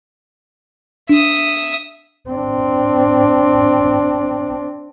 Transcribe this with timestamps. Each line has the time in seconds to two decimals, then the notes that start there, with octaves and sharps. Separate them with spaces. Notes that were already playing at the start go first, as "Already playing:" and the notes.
1.09 D4 E5 D#6
2.30 C4 D4